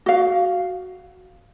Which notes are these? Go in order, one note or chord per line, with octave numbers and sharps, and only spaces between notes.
F#4 F5